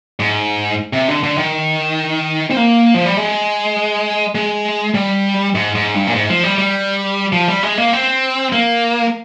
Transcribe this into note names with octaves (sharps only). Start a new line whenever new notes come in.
G#2
C3
D3
D3
D#3
C4
A#3
F3
G3
G#3
G#3
G3
G#2
G#2
G2
A#2
G#2
F3
G3
G3
F3
G3
G#3
A#3
C4
A#3